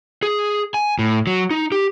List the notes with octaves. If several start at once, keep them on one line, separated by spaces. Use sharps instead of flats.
G#4
G#5
A2
F#3
D#4
G4